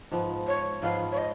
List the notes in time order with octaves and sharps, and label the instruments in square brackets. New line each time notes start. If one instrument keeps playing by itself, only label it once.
[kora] G#2 F3 B3
[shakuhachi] C#5
[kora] G#2 F3 B3 [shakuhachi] F5
[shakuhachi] C#5
D#5